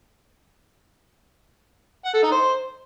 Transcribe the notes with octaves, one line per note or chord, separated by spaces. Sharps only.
F#5
A4
D#4
C5